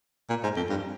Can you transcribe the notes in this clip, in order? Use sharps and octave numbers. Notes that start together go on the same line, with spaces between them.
A#2
G#2
F2
G2